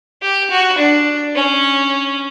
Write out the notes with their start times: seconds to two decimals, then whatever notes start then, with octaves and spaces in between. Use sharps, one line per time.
0.22 G4
0.51 F#4
0.78 D4
1.36 C#4